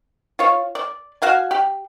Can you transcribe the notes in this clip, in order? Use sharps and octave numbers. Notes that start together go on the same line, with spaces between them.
F4 C#5
D5
F#4 F5 G#5
G4